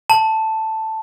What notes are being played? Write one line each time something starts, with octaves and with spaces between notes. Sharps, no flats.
A5